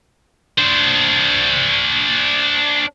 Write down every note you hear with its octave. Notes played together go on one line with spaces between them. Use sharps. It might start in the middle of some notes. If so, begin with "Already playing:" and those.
D4 C5